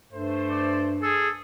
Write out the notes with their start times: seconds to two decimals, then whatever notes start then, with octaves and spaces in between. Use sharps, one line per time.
0.13 G2 A3 C5
0.50 D5
1.03 G#4 A4